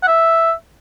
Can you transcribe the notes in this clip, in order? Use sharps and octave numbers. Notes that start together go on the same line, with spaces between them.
F#5
E5